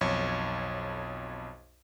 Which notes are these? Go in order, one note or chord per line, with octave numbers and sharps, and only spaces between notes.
B1 F2 C#5